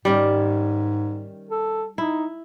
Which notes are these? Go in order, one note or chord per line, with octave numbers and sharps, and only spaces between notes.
G#2 D#3 G3 C#4 D5
A4
D#4 E4